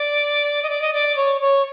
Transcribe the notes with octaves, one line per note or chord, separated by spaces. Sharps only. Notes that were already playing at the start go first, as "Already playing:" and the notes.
Already playing: D5
D#5
D5
D#5
D5
C#5
C#5